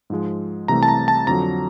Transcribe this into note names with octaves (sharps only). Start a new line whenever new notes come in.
G#2 F3 G#3
C2 C3 E3 A3 A#5
A5
A#5
A5
F2 D3 F#3 A#5